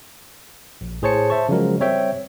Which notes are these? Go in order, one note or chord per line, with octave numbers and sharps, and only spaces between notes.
A#1
A2 G#4 C5 C#5 A5 C#7
C5 E5 A5 C#6
C#3 F3 F#3 G#3 F#4 A#4
G3 C4 C#5 E5 G5